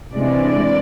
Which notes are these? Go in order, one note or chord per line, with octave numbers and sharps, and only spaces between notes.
C3 E3 G#3 D4 D5